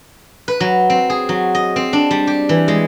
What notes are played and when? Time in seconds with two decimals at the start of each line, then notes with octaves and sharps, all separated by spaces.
0.48 B4
0.60 F#3
0.90 C4
1.10 G#4
1.29 F#3
1.55 D#5
1.76 C4
1.93 D4
2.11 G3
2.27 G4
2.49 E3
2.68 G#3